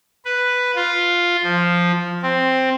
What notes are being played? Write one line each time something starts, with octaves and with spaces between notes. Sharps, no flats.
B4
F4
F3
C4